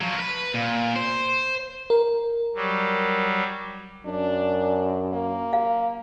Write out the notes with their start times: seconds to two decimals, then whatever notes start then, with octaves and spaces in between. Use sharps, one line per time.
0.01 F3 F#3
0.17 A#4 B4
0.54 A#2
0.96 C5
1.90 A#4
2.55 F#3 G3
4.06 F#2 D4
5.13 A#3
5.53 F5